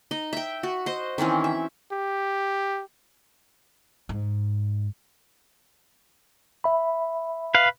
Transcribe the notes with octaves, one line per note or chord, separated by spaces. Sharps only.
D#4 D#5
E5 G5
F#4
C5 D#5
D#3 E3 C4 C#4
E5
G4
G#2
E5 B5
B4 F5